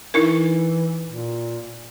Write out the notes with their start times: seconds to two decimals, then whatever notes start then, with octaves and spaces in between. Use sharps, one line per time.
0.14 E3 D#4 E4 A#4
1.06 A#2